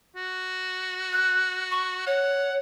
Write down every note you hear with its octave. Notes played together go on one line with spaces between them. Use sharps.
F#4
F#6
C#6
C#5 F#5